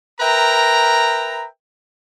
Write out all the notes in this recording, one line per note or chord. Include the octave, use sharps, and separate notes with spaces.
A#4 B4 E5 G5 A#5